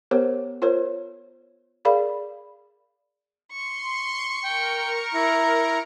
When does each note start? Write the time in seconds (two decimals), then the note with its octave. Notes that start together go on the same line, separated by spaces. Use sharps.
0.11 B3 G4 A#4 C5 C#5
0.62 F4 A#4 C5 C#5
1.85 G#4 A#4 D5 F5 B5
3.52 C6 C#6
4.44 A#4 G5
5.14 E4 A#5